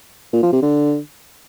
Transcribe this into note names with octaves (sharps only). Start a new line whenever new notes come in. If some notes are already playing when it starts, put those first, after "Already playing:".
A#2
F3
C3
D3